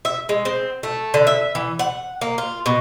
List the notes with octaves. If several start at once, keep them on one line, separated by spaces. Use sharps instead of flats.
E5
G#3
C4
A3
D3
E5
E3
F#5
A#3
F4
B2